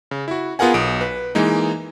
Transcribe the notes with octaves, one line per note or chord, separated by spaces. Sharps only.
C#3
E4 F#4
B3 F4 G#4 A#4 F#5 G#5
B1 D#6 D7
B4
E3 G#3 A#3 D#4